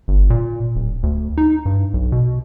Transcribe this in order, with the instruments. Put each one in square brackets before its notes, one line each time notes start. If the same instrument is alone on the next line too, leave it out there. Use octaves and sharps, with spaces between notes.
[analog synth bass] G1
A#2
D1
D2
D#4
G2
B1
B2